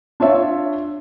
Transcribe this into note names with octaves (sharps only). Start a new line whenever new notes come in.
D4 F4 C#5 E5